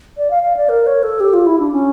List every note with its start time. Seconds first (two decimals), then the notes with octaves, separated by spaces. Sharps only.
0.17 D5
0.30 F5
0.43 F5
0.57 D5
0.69 A#4
0.86 C#5
1.03 A4
1.20 G4
1.33 F4
1.46 E4
1.59 D4
1.72 C#4